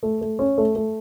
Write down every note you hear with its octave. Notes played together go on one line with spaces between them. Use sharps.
A3
A3
C#4
A3
A3